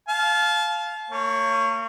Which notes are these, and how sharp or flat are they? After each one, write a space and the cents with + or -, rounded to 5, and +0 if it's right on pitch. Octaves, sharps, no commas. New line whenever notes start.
F5 +0 A5 -30
A#3 -40 C#5 +0